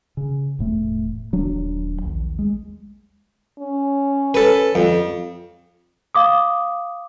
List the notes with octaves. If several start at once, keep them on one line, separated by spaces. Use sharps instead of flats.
C#3
E1 A2 A3
D#1 F#3 D4
A#1 D#2
G#3
C#4
A4 B4
F2
F5 D6 D#6